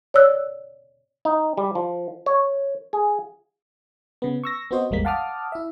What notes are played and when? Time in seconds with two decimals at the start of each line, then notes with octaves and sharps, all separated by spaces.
0.14 C#5 D5 E6 F#6
1.25 D#4
1.58 G3
1.75 F3
2.26 C#5
2.93 G#4
4.22 C#3 B3
4.44 C#6 E6 A#6
4.71 B3 C4 F#4 C5 D#5
4.91 A1 E2 G3 G#3 A#3 B6
5.05 F5 F#5 A5 D6 D#6 F6
5.52 E4 E5